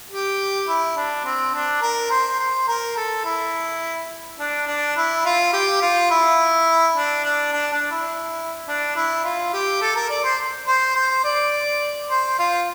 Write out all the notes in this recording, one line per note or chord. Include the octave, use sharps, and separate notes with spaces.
G4
E4
D4
C4
D4
A#4
C5
C5
A#4
A4
E4
D4
D4
E4
F4
G4
F4
E4
D4
D4
D4
D4
E4
D4
E4
F4
G4
A4
A#4
D5
C5
C5
C5
D5
C5
F4